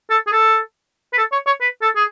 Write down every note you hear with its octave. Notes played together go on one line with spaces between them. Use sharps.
A4
G#4
A4
B4
A4
C#5
C#5
B4
A4
G#4